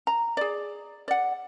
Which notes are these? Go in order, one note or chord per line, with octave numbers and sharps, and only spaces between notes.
A#5
G#4 D5
D5 F#5